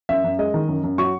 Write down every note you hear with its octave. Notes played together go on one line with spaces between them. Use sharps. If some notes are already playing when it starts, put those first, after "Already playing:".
F#2 E5
F#2
G#3 D#5
D#3
F#2
F#2
F#3 C#6